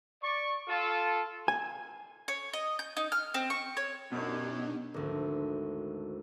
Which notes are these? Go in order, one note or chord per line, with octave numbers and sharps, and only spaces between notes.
D5 C#6
F4 A4
G#5
C#5
D#5
G6
D#4
F6
C4
C#6
C#5
F#2 B2 D4 D#4 G4
G#1 D2